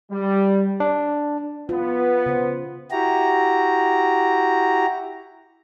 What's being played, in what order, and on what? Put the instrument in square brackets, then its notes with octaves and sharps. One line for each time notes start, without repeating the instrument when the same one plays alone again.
[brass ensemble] G3
[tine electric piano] D4
[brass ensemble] B3 [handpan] F4
[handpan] C#3 C5
[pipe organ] E4 F#4 G4 A#5